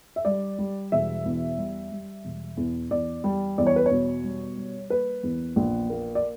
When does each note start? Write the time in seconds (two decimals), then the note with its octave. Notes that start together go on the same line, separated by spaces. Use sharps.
0.16 E5
0.25 G3 D5
0.58 G3
0.92 E1 E5
1.25 E2
1.57 G3
1.92 G3
2.25 E1
2.57 E2
2.90 E2 D5
3.24 G3
3.58 E2 D5
3.67 C#5
3.76 B4
3.86 C#5
3.91 B2
4.24 G3
4.57 G3
4.90 A#3 B4
5.23 E2
5.56 A#1
5.90 A#3
6.15 D5